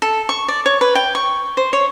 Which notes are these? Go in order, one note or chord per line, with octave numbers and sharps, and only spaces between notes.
A4
C#6
D5
C#5
B4
G5
C#6
C5
C#5